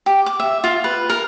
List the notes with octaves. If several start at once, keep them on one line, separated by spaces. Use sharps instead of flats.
G4
D6
E5
F4
B4
A#4